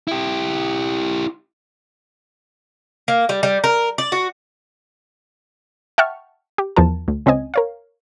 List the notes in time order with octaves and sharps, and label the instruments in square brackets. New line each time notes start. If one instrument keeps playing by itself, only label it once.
[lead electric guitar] E4 G4
[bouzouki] A#3
G3
G3
A#4
D5
F#4
[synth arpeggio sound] E5 F#5 G5 A5 C#6 F6
G4
E2 F3 F4 A#4 A5
D2
C#2 C4 C#4 D#5 G#5
A#4 C#5 F5